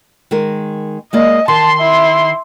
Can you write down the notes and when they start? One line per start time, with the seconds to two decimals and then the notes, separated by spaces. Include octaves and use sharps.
0.31 D#3 G#3 A#4
1.13 G#3 A#3 D5 D#5
1.48 D#3 A5 C6
1.80 E4